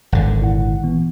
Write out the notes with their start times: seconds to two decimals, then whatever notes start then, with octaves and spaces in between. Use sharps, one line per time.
0.12 G#1 D3
0.40 A#2 E4 F#5
0.83 A#2 E3 B3